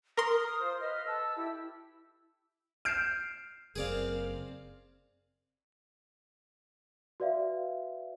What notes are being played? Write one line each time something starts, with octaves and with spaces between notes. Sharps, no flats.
A#4 C6 D#6
F6
F4 C5
B4 D#5 F6
A4 A5 E6
E4 G4
F6 G6 C7 D7 E7
F#1 C4 G#4 A#4 D5 F5
F#4 B4 D5 E5 F5